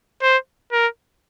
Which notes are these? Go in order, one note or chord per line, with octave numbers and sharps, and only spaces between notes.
C5
A#4